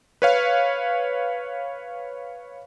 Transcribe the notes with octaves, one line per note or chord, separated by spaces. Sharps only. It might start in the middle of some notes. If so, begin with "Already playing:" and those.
B4 C#5 F5